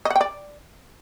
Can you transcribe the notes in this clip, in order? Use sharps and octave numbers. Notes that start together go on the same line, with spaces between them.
D#5
F#5
G5
D5